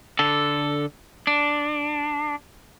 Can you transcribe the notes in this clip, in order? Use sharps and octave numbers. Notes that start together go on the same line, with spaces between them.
D3 A4
D4